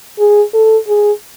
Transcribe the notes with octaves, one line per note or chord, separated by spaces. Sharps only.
G#4
A4
G#4